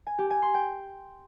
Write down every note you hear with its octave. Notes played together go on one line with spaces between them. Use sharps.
G#5
G4
G#5
C6
G5